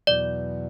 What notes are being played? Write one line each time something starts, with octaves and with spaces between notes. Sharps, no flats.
E2 B2 F#3 D5